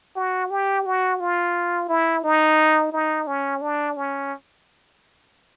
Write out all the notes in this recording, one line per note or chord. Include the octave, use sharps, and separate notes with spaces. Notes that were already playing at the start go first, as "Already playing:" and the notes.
F#4
G4
F#4
F4
E4
D#4
D#4
C#4
D4
C#4